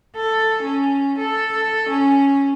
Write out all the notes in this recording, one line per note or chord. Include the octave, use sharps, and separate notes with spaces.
A4
C#4
A4
C#4